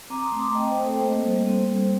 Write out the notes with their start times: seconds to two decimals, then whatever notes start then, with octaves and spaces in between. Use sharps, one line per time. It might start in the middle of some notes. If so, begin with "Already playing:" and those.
0.10 C4 A#5 D6
0.24 C6 D#6
0.32 A3
0.40 A#5 D6
0.55 C4 D#5 G5
0.71 C5 D#5
0.78 A3
0.85 A4 C5
1.01 A#3
1.24 G3
1.46 C4
1.69 G3